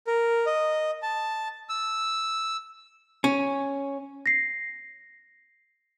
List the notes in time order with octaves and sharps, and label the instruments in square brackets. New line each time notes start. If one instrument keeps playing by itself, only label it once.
[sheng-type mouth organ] A#4
D#5
A5
E6
[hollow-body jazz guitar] C#4
[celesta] A#6 C7